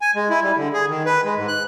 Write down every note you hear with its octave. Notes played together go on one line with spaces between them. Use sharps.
G#5
G#3
E4
G3
D3
G#4
D#3
B4
G#3
G#2
F#6